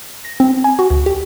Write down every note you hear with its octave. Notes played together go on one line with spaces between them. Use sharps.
A#6
C4
G#5
F#4
D2
G4